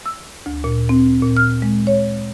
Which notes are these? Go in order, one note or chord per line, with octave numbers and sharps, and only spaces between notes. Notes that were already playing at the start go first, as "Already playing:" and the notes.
E6
D2
A#2
C4
A#2
F6
G#3
C#5